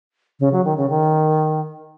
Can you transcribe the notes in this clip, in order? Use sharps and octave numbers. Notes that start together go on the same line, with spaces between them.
C#3
F#3
D#3
C#3
D#3